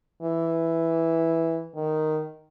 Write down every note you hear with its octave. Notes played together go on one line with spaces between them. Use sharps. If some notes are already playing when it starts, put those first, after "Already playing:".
E3
D#3